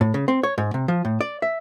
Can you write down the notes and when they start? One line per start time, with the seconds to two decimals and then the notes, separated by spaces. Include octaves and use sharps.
0.01 A2
0.14 C#3
0.28 C4
0.43 C#5
0.58 G#2
0.74 C3
0.88 F3
1.05 A2
1.21 D5
1.42 E5